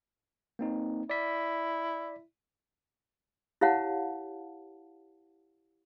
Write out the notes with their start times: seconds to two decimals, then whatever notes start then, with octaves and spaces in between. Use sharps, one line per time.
0.59 A#3 C4 D#4
1.10 E4 D5 B6
3.61 E4 G4 C#5 F5 F#5 A5